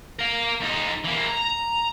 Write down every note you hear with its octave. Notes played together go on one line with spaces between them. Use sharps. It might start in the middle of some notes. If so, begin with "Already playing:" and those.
A#4 F5
F2 D#4
E3 A#3
A#5